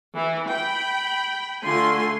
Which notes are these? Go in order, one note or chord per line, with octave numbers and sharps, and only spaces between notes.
E3
G5 B5
D3 A3 F4 G#5 C6